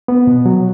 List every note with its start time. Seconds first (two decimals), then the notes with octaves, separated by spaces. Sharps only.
0.08 B3
0.27 B2
0.46 F#3